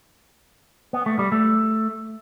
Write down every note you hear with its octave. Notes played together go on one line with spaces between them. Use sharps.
B3
A3
G3
A3